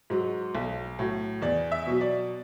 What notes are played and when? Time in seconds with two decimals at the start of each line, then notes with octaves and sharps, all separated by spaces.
0.10 G#2 F#3
0.55 B1
0.99 A2 F#3
1.42 E2 D5
1.72 E5
1.86 B2 F#3
2.01 D5